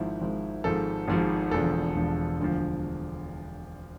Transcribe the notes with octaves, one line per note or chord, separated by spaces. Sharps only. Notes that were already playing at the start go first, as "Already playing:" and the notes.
Already playing: G#1 G#2 F3 E4
G#1 G#2 F3
G#1 G#2 F3 A4
G#1 G#2 F3
E1 E2 D3 F3 A4
E1 E2 D3 F3
E1 D2 D3 F3